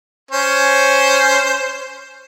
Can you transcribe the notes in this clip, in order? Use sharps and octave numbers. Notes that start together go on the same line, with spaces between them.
C#4 C5